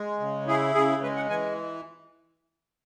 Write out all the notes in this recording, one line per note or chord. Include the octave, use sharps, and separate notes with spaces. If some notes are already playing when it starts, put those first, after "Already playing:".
Already playing: G#3
C#3
E4 G#4
C#3 G#4
G#3 B4
F#5
E3 G#5